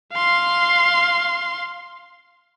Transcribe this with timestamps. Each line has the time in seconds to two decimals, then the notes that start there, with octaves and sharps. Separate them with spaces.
0.13 F5 C6